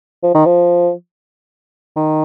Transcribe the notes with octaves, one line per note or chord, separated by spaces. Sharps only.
F3
D#3
F3
D#3